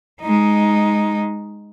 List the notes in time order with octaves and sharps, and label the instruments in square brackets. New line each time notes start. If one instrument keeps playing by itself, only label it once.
[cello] G#3 D#4